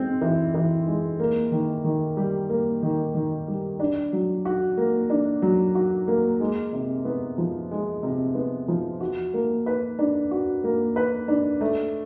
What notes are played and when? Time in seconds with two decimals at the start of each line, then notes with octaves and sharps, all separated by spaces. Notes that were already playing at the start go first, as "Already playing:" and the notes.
Already playing: G#3 C4
0.21 E3
0.54 E3
0.87 G#3
1.20 A#3
1.52 D#3
1.84 D#3
2.17 G3
2.49 A#3
2.83 D#3
3.14 D#3
3.48 G3
3.80 D4
4.13 F#3
4.45 F#4
4.77 A#3
5.10 D4
5.42 F#3
5.75 F#4
6.08 A#3
6.40 G#3
6.73 C3
7.05 B3
7.38 F3
7.71 G#3
8.03 C3
8.35 B3
8.68 F3
9.01 F#4
9.34 A#3
9.66 B4
9.99 D4
10.31 F#4
10.64 A#3
10.96 B4
11.28 D4
11.61 A3